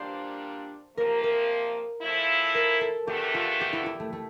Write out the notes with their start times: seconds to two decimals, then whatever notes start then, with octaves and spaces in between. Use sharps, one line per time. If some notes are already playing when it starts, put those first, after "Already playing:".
Already playing: A#2 G3 A#3 D4 C5
0.97 C3 F3 A#3 A#4
1.23 A#4
2.02 A#2 F3 A3 E4
2.55 A#4
2.81 A4
3.07 E2 D3 A3 G4
3.34 F4
3.61 G4
3.73 E4
3.86 E4
4.00 A3
4.13 A3